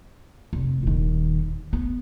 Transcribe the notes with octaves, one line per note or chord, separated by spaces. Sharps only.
F1
D#1 D#3
B3